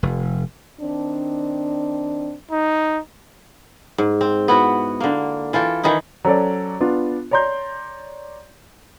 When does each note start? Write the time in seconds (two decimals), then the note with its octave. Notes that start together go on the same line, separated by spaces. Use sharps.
0.03 F1
0.80 D#3 C4 D4
2.51 D#4
3.98 G#2
4.21 C4
4.48 B3 E4 F#4
5.00 D3 A#3
5.53 E3 F4 A4 G5
5.83 D#3 E3 D#4 E4
6.24 F#3 C#4 A4 C5 D5
6.80 B3 D4 F4
7.31 C#5 D5 A#5 C6 G6